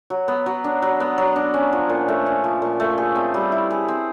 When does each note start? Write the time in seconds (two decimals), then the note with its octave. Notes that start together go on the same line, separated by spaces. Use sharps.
0.10 F#3
0.28 B3
0.46 F#3
0.64 D4
0.82 F#3
1.00 B3
1.18 F#3
1.36 D4
1.54 C#4
1.73 F3
1.89 A#2
2.08 A3
2.26 C#4
2.44 F3
2.62 A#2
2.80 A3
2.98 G#4
3.15 C4
3.34 G3
3.52 E4
3.71 G#4
3.88 C4